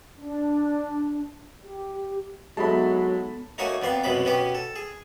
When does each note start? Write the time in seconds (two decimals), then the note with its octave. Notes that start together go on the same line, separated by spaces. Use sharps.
0.18 D4
1.60 G4
2.57 F#3 G#3 B3 D#4 A4 E5 A5 B5
3.58 A3 A#3 D#4 F#4 C#5 G#5
3.82 F2 B3 D5 F5 G5
4.04 C2 F#2 B2 F#3 B5 D6
4.25 B2 B3 C#4 G4 D6
4.55 A4
4.76 G#4